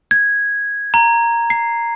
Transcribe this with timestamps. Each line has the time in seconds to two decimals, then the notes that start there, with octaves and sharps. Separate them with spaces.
0.11 G#6
0.94 A#5
1.50 C7